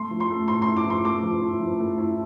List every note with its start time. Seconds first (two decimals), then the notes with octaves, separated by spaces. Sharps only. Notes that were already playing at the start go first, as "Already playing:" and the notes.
Already playing: A3 C6
0.11 F3
0.20 C6
0.30 A3
0.48 A2 C6
0.62 C6
0.67 E4
0.77 D6
0.86 F3 C6
1.05 A3 D6
1.23 F3
1.41 E4
1.60 F3
1.80 A3
1.98 E4